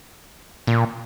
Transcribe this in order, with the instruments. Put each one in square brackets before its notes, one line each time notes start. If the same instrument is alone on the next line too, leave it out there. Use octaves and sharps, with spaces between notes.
[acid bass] A#2